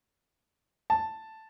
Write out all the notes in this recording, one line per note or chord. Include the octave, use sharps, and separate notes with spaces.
A5